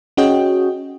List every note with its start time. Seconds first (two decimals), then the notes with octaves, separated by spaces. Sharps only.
0.17 C#4 F#4 G#4 C#5 D#5 G5